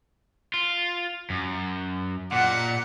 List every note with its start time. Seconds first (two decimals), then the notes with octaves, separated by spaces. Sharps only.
0.54 F4
1.30 F#2
2.32 A#2 F#5